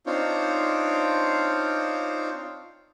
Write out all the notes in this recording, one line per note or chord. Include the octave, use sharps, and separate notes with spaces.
C4 D4 D#4 F4 C5 C#5